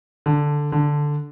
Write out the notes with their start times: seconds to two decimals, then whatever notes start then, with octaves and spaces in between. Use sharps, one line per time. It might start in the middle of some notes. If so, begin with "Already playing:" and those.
0.26 D3
0.72 D3